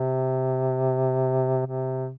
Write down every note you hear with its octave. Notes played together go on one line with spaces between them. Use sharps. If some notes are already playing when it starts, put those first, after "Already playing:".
Already playing: C3
C3